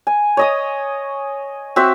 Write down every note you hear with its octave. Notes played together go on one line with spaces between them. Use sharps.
G#5
C#5 D#5 D#6
C4 F#4 E5